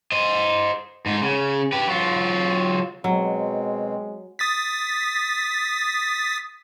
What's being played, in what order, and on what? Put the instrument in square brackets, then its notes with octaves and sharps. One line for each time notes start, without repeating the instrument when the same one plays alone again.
[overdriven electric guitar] C5 D#5
G#2 D#4
C#3
G4 B4
F#3 F4
[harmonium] B2 C4 [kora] F#3 [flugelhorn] G#3
[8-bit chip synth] D#6 A6 B6